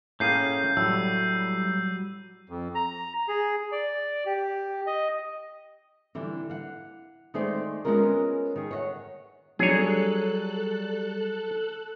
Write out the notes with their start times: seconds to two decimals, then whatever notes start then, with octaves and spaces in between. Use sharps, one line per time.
0.20 A2 A#3 C#4 G#4 F5 G6 C7 D#7
0.77 A2 F#3 G3 E6
2.50 F2
2.75 A#5
3.28 G#4
3.72 D5
4.26 G4
4.87 D#5
6.15 D3 E3 G3 D4
6.49 F5 F#5
7.34 D#3 G#3 A3 G#4 C5 D5
7.85 G#3 B3 C#4 F4 G#4 A#4
8.56 D#3 G#4
8.71 C#5 D#5 F#5
9.59 F#3 G3 D4 G#4 A4 C#5 F#6